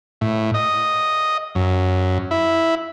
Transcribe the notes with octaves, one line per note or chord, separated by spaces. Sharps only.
A2
D#5
F#2
E4